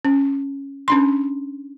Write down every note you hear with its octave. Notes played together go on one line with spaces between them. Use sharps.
C#4
C#4 D4 C6